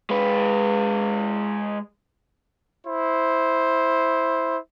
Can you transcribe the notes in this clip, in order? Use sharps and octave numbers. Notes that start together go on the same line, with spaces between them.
G#3 B4
E4 C5